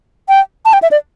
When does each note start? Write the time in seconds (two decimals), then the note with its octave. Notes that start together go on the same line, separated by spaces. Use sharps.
0.29 G5
0.65 A5
0.73 G5
0.82 E5
0.91 D5